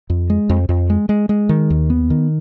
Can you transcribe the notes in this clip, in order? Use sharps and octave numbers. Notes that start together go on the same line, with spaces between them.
F2
G#3
F2
F2
G#3
G#3
G#3
D#3
D#2
B3
D#3